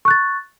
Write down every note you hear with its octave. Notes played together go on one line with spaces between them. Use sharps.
C#6 F#6 A6